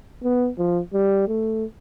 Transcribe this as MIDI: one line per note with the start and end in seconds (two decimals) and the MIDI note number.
0.24 0.49 59
0.58 0.80 53
0.94 1.27 55
1.28 1.65 57